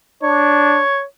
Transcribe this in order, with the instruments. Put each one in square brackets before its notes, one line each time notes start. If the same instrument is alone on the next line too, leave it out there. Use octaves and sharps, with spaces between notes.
[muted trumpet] D4 [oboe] C#5